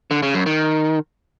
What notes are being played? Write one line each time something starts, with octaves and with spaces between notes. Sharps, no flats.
D3
C#3
F#2
D#3